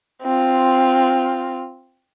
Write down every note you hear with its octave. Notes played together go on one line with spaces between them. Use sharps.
C4 F4